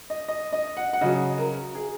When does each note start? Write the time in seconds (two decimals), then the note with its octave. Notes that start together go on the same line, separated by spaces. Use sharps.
0.10 D#5
0.28 D#5
0.53 D#5
0.77 F#5
0.93 F#5
1.01 C#3 F#3 D#5
1.38 A#4
1.75 G#4